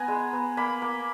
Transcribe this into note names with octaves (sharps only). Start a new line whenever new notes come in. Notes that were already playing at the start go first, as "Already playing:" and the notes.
Already playing: B3 G#5 A#5
G#3
B3
A#3 B5
A#3